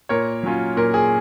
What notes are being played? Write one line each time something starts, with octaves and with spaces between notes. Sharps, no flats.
A#2 A#4 C#5
F#3 C#4 F4
A#2 A#4
G#4